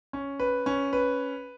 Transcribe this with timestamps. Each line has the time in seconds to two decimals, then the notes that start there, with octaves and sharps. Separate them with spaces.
0.13 C#4
0.40 B4
0.66 C#4
0.93 B4